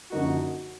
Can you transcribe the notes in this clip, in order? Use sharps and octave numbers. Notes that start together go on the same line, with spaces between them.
F#2 D3 F3 A#3 D#4 F#4